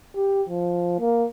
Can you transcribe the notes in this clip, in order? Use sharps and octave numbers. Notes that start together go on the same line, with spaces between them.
G4
F3
A#3